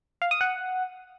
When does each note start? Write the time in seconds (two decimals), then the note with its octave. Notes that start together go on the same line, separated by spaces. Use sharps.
0.22 F5
0.31 D#6
0.41 F#5